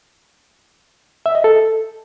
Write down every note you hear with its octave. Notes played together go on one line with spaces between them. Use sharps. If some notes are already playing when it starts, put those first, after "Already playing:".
E5
D#5
A4